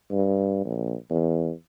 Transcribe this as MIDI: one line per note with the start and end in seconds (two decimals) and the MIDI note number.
0.11 0.63 43
0.65 0.95 34
1.10 1.51 40